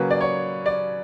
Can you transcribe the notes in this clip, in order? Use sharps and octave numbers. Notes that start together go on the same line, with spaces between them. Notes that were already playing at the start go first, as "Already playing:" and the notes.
Already playing: C#3 F#3 A#3 B4
D5
C#5
D5